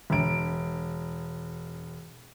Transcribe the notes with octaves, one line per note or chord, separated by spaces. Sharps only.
E1 D7